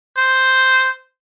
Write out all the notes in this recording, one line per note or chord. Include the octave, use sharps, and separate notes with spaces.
C5